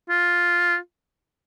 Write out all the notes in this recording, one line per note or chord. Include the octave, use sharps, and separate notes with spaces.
F4